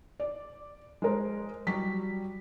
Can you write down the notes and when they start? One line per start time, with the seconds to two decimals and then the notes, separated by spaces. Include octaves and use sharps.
0.20 D5
1.02 G#3 A#4 C5
1.67 F#3 G3 B6